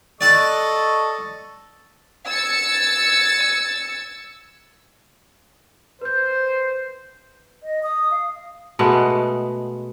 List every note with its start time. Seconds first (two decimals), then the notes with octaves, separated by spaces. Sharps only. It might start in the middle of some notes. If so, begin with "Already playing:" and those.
0.21 A4 D5 D#5 F#5 A5 C#6
2.27 E6 G#6 A6 C#7
6.02 B4 C5 G6
7.63 D#5
7.83 D#6
8.11 F5
8.79 B2 G#3 A3 B3